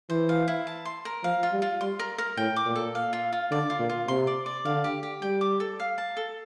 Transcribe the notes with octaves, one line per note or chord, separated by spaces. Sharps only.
E3 C5
F5
E4
A5
C6
A#4
F3 F5
F4
G3
F4
G3 C6
A#4
A#4
A2 G5
D6
A#2
A4
F5
F4
F4
D3 D5
F4
A#2
F4
C3 C6
D5
D5
D3 F5
G4
G4
G3 G5
D6
A4
F5
A5
A4